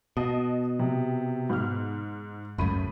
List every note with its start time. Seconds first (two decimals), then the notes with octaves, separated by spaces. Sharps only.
0.17 B2 D#5 A5 D#6
0.79 C3
1.49 G#2 F6
2.58 F#1 C#2 F#2 A2 B5 D#7